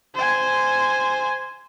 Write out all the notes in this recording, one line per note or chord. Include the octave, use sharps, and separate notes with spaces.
C5 G#5